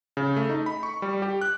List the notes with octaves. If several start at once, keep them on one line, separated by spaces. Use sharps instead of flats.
C#3
A3
D#4
B5
C#6
G3
G4
F#6